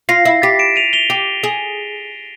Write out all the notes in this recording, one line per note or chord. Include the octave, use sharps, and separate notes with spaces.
F4 A#6 C7
E4
G4 A6 B6
D7 E7
D#7 F7
F7 G7
G4
G#4